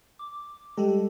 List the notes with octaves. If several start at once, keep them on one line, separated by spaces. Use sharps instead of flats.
D6
G3 G#3 G4 A4